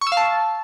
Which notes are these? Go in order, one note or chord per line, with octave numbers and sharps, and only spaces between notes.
C#6
E6
F5
A5